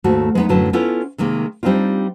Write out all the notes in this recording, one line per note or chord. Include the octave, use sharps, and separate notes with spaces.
D#2 G#2 A3 F#4 A5
G#3 B3 D#4
F#2 A2 D3 F#3 B4 A5
B3 C#4 E4 F4 A4
C3 D#3 G#3 A#3
G3 C4 D4 D#4 F4